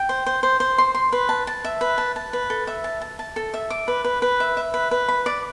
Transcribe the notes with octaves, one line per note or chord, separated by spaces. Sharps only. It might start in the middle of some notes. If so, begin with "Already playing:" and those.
Already playing: G5
C5
C5
C5
C5
C6
C6
B4
A5
A5
E5
B4
A5
A5
B4
A4
E5
A5
A5
A5
A4
E5
D6
B4
B4
B4
E5
E5
B4
B4
B5
D5